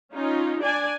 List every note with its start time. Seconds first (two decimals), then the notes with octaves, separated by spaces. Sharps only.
0.14 C#4 D#4 F4
0.62 D4 D5 G#5